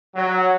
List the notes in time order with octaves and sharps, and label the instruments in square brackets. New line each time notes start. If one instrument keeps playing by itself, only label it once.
[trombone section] F#3